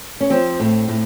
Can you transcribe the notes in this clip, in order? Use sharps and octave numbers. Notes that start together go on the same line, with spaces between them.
C#4
F3 C4
A2
A2